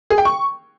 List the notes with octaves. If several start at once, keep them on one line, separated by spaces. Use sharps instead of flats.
G#4
G5
C#6